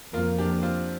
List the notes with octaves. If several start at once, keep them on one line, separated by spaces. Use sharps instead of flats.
F2 F3 A#3 F4 A#4
D4 G4
C4 F4